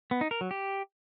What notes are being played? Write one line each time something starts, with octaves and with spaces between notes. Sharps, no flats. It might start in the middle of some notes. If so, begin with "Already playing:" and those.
B3
D#4
A#4
F#3
G4